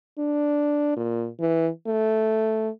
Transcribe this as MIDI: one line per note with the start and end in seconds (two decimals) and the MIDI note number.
0.18 0.93 62
0.97 1.28 46
1.40 1.69 52
1.87 2.69 57